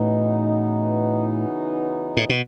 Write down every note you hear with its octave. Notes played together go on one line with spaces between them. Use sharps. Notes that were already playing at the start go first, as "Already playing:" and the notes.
Already playing: A2 C#3 E3 B3 D#4 F#4
A2
B2